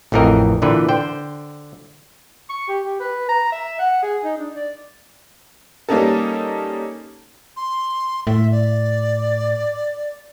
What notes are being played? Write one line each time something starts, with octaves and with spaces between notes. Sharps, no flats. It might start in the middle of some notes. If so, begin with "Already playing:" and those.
A1 F2 E3 C4 A#4 D#5
A#2 D3 E3 B4 G5
D3 C5 G5
C#6
G4
G4
B4
A#5
E5
F#5
G#4
D#4
D4
D5
G3 A#3 C#4 D#4 A4
C6
A2 E5
D5